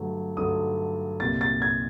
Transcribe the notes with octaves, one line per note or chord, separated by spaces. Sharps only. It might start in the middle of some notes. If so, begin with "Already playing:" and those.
Already playing: G2 D3 F#3 A3
G2 D3 F#3 A3 D#6
C2 A#2 G3 A6
A6
G#6